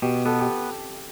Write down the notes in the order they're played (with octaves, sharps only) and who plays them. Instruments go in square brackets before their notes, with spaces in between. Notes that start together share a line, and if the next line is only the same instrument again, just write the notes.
[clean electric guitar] B2 [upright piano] G4
[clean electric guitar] B3 [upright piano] A4
[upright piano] G4